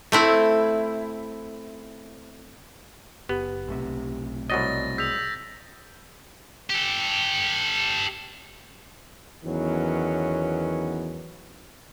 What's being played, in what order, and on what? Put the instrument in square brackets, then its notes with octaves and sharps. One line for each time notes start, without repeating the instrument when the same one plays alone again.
[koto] A3 C4 E4
[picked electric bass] F#1 [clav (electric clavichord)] B3 [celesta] G4
[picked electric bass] B1 A2 C3
[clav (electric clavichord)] C2 F#3 D#5 [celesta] D5 F#5 A#5 [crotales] A6 A#6
[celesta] G#4 D#6 F7 [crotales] E6 G6 B6
[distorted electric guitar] G4 A4
[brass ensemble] E2 D#3 F#3 B3 C#4